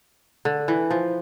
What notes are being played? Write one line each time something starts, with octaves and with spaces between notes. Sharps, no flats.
D3
E3
F3